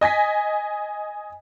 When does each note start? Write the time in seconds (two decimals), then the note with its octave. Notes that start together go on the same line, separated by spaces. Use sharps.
0.01 D#5 G#5 A#6 B6